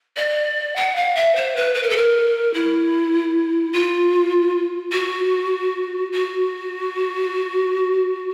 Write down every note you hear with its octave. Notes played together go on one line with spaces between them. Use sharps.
D5
F#5
F5
E5
C5
B4
B4
A#4
A4
A#4
E4
F4
F#4
F#4